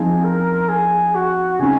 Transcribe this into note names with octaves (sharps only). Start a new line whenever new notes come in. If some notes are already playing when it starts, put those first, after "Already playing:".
Already playing: F3 C4 D#4 G#4
A#4
G#4
F#4
C#3 G#3 C4 D#4 G#4